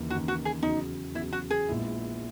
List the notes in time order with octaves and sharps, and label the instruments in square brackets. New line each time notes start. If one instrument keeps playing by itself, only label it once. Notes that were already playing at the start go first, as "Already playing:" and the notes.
Already playing: [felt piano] D#2 C#3 E3 A#3 D#4
[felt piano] D#2 C#3 E3 A#3 D#4 [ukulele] F#4
[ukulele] F#4
G#4
[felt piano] E2 C#3 F#3 [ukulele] D#4
[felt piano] E2 [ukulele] E4
[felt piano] C#3 F#3
[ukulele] F#4
G#4
[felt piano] A#1 A#2 G#3 B3 E4